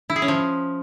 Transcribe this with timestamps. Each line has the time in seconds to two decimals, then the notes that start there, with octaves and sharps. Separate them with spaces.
0.10 E4
0.16 G#4
0.22 C#4
0.28 F3